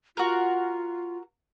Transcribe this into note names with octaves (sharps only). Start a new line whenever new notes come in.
F4 F#4 A#4